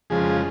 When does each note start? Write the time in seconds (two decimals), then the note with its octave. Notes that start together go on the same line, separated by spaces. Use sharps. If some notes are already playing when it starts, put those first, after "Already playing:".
0.10 F2 C#3 F3 G#3 G#4